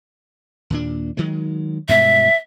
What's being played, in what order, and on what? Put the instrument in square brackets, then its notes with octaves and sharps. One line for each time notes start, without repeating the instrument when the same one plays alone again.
[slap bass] D#2 A#2 D4
D#3 F#3 G#3
[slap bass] G2 B2 G#3 [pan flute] E5